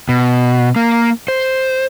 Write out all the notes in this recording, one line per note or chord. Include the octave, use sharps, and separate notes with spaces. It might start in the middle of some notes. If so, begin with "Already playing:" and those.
B2
A#3
C5